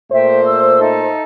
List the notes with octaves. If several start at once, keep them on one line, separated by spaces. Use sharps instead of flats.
A#2 A3 C5 E5 G5
E6
D#4 A4 E5